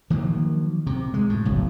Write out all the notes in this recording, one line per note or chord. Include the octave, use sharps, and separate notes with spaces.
D#3 F3 F#3 A#3
C3
G#3
A2
F#1 B1